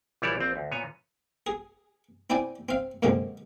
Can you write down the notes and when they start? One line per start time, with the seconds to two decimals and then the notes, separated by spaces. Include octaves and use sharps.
0.22 A#1 E3 G3 E4 C#5 D5
0.36 A#1 C4
0.56 D2
0.71 A#2 B3 C#5 G#5
1.47 G#4
2.30 C4 E4 D5 G5 G#5
2.69 C4 F5
3.03 F#2 A#2 D3 G#3 C4